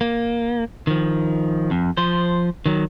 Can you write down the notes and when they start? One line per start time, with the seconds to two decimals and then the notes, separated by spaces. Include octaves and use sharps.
0.01 A#3
0.87 D#3 F3
1.71 F2
1.97 F3 C5
2.66 D#3 F#3